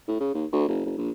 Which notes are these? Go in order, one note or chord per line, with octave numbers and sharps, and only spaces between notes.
A2
C#3
D#2
D2
F#1
F#1
A#1